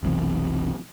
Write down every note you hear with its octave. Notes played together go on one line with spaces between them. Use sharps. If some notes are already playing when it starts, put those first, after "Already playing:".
F1 B1 C3 E3